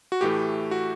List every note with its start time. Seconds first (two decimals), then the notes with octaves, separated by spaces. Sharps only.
0.12 F#4
0.21 A2 E3 A3 G4
0.71 F#4